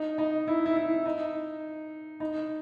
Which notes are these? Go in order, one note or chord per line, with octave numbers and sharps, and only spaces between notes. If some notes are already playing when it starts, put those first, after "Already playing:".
Already playing: D#4
D#4
E4
E4
E4
D#4
D#4